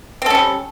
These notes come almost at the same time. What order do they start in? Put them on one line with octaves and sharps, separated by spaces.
C4 A4 C#4 G3